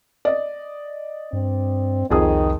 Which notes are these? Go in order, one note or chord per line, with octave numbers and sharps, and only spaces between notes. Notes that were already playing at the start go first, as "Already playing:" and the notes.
D5 D#5
G2 C4
C2 F2 D#3 G#4 D#6